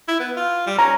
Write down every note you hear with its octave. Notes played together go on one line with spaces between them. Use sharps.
E4
B3
F4
G3
C#4 A#5